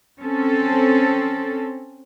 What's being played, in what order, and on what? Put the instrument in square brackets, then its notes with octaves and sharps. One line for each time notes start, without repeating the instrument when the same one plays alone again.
[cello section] C4 C#4 A4